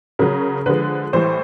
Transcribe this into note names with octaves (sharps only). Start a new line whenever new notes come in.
C#3 F#3 A#4
D3 F3 G#3 B4
A2 E3 G3 C5